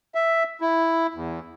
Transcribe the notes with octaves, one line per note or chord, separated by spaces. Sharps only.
E5
E4
E2